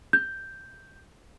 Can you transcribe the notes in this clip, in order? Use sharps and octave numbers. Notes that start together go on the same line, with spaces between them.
G6